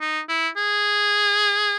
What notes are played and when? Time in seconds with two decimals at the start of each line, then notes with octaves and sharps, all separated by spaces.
0.01 D#4
0.29 E4
0.57 G#4